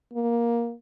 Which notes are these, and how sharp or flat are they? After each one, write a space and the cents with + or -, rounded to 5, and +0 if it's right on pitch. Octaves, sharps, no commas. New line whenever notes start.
A#3 +10